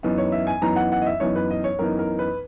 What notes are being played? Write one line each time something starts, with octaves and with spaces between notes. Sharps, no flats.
F#2 E3 B3 D#4
C#5
E5
G#5
F#2 E3 B3 D#4 A#5
F#5
F#5
D#5
E5
F#2 E3 B3 D#4 C#5
B4
D#5
C#5
F#2 E3 B3 D#4 A#4
A#4
B4